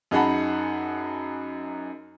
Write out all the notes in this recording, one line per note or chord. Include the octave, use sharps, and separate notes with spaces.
F#2 D#4 G#4 F#5 A5 B5